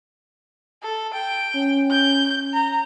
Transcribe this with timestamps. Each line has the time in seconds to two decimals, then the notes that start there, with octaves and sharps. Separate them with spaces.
0.83 A4
1.14 G5
1.55 C#4
1.91 G6
2.54 A#5